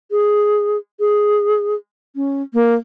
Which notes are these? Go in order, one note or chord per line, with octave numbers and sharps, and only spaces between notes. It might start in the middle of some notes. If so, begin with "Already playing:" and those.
G#4
G#4
C#4
A#3